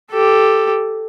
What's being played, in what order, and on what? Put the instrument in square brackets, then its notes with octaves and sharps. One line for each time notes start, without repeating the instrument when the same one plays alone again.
[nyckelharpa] G4 A4